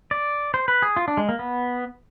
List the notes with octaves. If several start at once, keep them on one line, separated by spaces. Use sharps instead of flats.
D5
C5
B4
G#4
F4
D4
G#3
A#3
B3